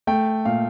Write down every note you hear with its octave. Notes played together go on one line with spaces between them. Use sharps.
A3 G5
A#2 F5